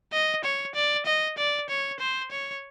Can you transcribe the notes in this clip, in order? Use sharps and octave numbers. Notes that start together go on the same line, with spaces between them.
D#5
C#5
D5
D#5
D5
C#5
C5
C#5